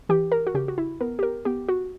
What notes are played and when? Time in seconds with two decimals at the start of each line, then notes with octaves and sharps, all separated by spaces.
0.09 E3 G4
0.32 A#4
0.47 F#4
0.54 C#3 G4
0.68 F#4
0.78 E4
1.01 B3 A#4
1.19 G4
1.23 A#4
1.45 B3 G4
1.69 F#4